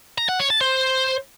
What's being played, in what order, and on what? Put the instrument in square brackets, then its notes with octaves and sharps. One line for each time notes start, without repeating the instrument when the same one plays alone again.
[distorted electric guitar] A#5
F#5
C#5
A5
C5